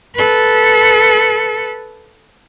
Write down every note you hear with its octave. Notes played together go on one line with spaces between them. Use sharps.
A4 B4